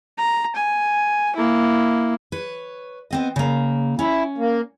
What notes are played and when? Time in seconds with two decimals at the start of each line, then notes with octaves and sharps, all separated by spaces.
0.18 A#5
0.56 G#5
1.36 A#3 E4
2.32 B4 C#5
3.11 B3 C4 D#5
3.36 C#3 A#3
3.99 C#4 E4
4.38 A#3